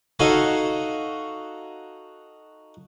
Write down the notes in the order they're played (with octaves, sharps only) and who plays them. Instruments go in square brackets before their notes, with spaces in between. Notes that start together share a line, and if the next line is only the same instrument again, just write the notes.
[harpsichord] D#4 F#4 A4 C#5 D#5 F5